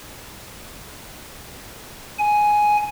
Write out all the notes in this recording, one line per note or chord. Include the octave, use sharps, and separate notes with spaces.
G#5